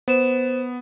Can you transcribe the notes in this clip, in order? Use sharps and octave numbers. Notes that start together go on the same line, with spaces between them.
B3 C5 E7